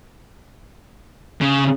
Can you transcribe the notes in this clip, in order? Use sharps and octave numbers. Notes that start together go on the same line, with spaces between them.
C#3